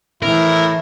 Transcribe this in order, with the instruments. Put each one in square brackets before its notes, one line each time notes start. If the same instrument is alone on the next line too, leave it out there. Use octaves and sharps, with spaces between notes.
[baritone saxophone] A2 [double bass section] E3 [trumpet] E4 [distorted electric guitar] A#4